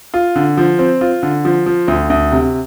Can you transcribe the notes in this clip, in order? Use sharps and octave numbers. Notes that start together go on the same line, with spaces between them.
F4
D3
F3
C4
F4
D3
F3
F3
D2
D2
C3